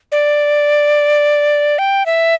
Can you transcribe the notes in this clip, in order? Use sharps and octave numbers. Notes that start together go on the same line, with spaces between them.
D5
G5
E5